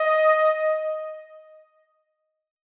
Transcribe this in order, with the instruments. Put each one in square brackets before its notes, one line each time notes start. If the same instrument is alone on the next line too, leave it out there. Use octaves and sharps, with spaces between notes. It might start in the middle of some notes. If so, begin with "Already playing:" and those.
Already playing: [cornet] D#5